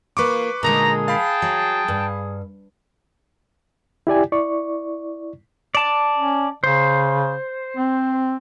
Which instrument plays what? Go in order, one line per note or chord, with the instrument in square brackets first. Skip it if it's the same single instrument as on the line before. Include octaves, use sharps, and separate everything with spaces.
[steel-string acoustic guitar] A#3 F4 [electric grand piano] B4 C#6 D6
[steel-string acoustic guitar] A#2 D3 G#3 [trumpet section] D#4 A#5 [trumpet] G#4
[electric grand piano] F5 B5 [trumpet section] G5 A5
[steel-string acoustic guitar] F#3
G2
[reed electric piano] E4 G4 D5 G#5
E4 D5 C#6
[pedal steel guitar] D5 A5
[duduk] C#4
[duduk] C#3 [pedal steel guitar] C5
[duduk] C4